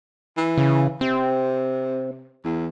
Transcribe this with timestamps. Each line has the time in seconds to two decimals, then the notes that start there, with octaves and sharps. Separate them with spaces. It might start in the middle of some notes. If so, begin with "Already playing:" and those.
0.37 E3
0.58 C#3
1.01 C3 C4
2.45 E2